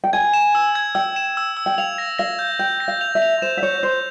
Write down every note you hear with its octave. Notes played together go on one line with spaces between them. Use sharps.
G5
G#5 G#6
E7
E6
G#6
G5 E6
E7
E6
E6
G5
F5 F7
A#6
F5 A#6
G6
G5 G6
A#6
F5
F7
E5
F7
C5 E7
E5
C#5 G6
C5 G6